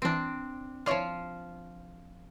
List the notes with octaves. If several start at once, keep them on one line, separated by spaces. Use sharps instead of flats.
E3 C4 D4 D7
F3 E4 F4 C#5 D5